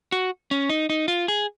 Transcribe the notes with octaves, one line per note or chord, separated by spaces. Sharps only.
F#4
C#4
D#4
D#4
F4
G#4